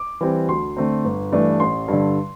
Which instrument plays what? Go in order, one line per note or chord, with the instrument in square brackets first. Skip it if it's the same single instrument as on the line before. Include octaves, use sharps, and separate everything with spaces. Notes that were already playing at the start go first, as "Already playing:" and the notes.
Already playing: [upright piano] D6
E3 G3 C4
D2 C6
D3 A3 C4
G1
G2 E3 A3 D4
A1 C6
G2 D3